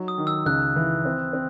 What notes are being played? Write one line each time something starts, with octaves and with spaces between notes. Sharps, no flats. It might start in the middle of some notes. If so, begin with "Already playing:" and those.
Already playing: F#3 D#4
D#6
D#3
E6
C#2 F#6
E3
C4
C4